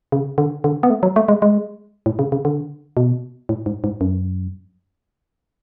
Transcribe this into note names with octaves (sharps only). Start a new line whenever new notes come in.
C#3
D3
D3
B3
A3
F#3
A3
G#3
G#3
A2
C#3
C#3
D3
B2
A2
G#2
G#2
F#2